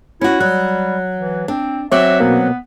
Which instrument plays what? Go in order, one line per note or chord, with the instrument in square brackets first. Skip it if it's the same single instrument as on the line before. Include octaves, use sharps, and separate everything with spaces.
[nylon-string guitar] C#4 F#4 [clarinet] E4
[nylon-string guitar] F#3 [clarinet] G3 [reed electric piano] F#6
[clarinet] E3
[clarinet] C4 [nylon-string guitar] D4
[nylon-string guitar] F#3 C4 [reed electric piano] C#5 D6 F#6 [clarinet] E5
[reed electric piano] B2 A#3 [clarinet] B3